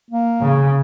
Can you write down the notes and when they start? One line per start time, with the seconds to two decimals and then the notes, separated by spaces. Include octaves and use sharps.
0.10 A#3
0.42 C#3